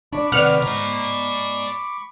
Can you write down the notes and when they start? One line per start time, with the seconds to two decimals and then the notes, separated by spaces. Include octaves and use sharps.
0.13 D4 D5 B5 C#6 D6
0.32 C3 D#3 C4 B4 D5 F#5 F6
0.63 G#2 D5 A#5